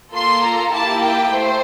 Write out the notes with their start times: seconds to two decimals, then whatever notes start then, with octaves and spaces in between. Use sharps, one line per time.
0.13 A#3 F4 A4 C6
0.43 A#5
0.72 A#3 E4 G4 A5
1.03 G5
1.33 A3 C5